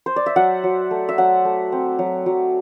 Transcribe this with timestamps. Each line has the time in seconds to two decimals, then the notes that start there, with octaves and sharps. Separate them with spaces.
0.06 C5
0.16 D5
0.26 E5
0.36 F#3 F#5
0.64 F#3
0.91 A3
1.09 E5
1.18 F#3 F#5
1.45 A3
1.72 C4
1.99 F#3
2.26 F#3